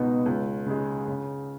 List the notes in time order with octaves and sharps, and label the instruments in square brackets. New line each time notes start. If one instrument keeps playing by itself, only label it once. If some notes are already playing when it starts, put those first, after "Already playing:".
Already playing: [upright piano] C#2 B2 B3 D#4
C#2
C#3 G#3
C#3